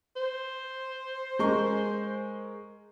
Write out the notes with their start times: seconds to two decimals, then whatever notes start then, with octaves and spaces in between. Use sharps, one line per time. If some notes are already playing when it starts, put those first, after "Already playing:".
0.16 C5
1.39 G#3 A#4 C#6